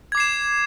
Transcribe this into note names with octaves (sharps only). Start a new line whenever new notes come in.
D6 G#6 C7 E7